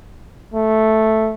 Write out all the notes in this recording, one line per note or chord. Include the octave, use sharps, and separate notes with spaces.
A3